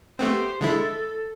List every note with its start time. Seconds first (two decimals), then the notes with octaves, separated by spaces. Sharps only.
0.19 A3 B3 C4 G4 C5
0.61 D3 G#3 E4 A4